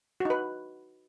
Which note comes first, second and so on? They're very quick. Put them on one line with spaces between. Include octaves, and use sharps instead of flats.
F#4 D#4 B4